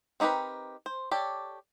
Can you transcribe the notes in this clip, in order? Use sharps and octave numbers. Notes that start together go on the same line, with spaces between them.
C4 D#4 G4 A#4 B4
C5
G4 A4 C#5 D5